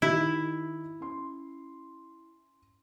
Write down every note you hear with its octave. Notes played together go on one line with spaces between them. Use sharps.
D#3 D#4 E4 G4
C#4 C6